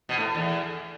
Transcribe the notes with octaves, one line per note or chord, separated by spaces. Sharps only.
B2
A2
E2